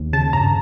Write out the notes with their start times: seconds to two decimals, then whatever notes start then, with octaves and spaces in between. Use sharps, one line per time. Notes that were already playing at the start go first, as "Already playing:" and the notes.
Already playing: D#2
0.13 C#3 A5
0.33 G2 A#5